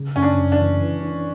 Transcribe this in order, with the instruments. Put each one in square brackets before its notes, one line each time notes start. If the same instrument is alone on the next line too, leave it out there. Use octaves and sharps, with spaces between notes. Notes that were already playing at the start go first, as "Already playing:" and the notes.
Already playing: [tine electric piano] C#3
[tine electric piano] F#2 [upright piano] C#4
[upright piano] D4
[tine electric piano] F#2
[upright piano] D4
[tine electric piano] E3
E3
D4